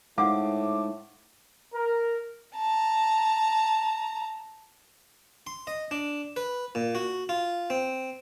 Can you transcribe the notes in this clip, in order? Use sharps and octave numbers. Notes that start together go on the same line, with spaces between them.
A2 G#3 D#4 C5 F5 F#5 D6
A#4
A5 A#5
C6
D#5
D4
B4
A#2
F#4
F4
C4